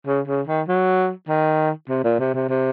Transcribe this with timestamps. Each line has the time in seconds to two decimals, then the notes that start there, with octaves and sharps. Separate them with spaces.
0.07 C#3
0.27 C#3
0.48 D#3
0.68 F#3
1.28 D#3
1.89 C3
2.04 A#2
2.19 C3
2.34 C3
2.49 C3